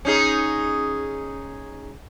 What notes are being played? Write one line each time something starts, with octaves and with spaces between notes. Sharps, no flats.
C#4 D#4 G#4